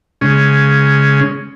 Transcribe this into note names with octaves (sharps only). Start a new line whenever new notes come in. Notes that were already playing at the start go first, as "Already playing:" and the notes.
C#3 G#3 C#4